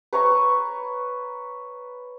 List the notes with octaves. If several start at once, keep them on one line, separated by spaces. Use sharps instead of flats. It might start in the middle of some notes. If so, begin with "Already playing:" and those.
B4 C#5 A#5 C#6